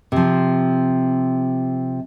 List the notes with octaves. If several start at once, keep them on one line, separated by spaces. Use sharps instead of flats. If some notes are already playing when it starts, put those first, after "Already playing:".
C3 F3